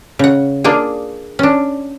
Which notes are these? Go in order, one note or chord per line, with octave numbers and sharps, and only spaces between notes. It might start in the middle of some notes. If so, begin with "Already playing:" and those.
C#3 F#5
A#3 D4 F4 G#4
C#4 D4